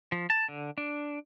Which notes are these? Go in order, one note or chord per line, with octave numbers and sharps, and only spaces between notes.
F3
A5
D3
D4